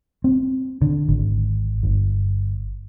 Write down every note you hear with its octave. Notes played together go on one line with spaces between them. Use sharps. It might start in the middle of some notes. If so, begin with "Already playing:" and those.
C4
D3
G#1
G1